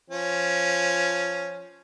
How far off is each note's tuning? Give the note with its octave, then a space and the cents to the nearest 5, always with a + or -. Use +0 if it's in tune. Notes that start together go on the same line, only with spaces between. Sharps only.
F3 +0 C#4 +0